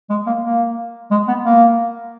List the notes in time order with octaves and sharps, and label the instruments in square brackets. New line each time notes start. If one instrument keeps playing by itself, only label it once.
[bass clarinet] G#3
A#3
A#3
G#3
B3
A#3